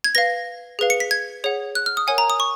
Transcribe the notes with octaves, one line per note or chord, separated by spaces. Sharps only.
G#6
B4 F5 A#6
G#4 B4 F5
C#7
B6
G#6
G#4 C#5 F#5
F#6
F6
D#6
A#4 C#5 F#5 G#5
A#5
D#6
C#6